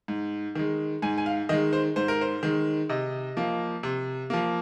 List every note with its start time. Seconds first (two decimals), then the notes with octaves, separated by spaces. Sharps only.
0.08 G#2
0.55 D#3 G#3
1.02 G#2 G#5
1.18 G#5
1.26 F5
1.49 D#3 G#3 D#5
1.73 C5
1.96 G#2 C5
2.08 A#4
2.21 C5
2.43 D#3 G#3
2.89 C3 D#5
3.37 F3 A#3
3.83 C3
4.30 F3 A#3